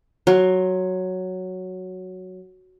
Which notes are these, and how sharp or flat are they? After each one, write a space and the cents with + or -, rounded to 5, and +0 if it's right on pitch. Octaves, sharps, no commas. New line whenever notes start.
F#3 +0 C6 +30